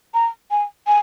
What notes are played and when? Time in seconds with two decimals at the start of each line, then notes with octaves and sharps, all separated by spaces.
0.14 A#5
0.51 G#5
0.87 G#5